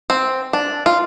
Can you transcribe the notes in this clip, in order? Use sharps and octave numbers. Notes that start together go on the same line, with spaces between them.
C4
D4
F4